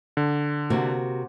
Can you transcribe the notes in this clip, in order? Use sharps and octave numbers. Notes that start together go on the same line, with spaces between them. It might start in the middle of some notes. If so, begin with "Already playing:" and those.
D3
C3 A#3 F#4